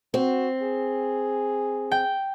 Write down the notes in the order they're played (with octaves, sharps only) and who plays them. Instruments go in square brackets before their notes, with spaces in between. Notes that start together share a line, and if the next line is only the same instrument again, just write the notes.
[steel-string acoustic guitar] C4 [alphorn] F#4
[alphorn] G#4
[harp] G5